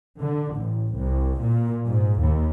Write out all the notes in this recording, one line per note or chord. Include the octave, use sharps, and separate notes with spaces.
D3
A1
C2
A#2
G#2
D#2